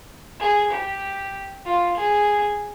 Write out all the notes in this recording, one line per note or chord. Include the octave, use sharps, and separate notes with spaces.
G#4
G4
F4
G#4